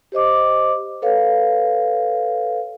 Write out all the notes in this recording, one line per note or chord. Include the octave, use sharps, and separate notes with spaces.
G4 C5 D#5 D6
A4 B4 C#5 F5